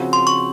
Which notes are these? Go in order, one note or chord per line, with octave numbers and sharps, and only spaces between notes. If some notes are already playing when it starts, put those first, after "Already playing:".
Already playing: C#3 F3 C4 F#4
C6
C#6